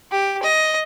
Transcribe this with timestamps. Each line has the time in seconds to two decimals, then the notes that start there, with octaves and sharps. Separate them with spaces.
0.12 G4
0.43 D#5